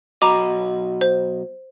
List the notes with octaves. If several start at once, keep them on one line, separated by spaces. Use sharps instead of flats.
B1 F#4 D#5 A#5 D6
C5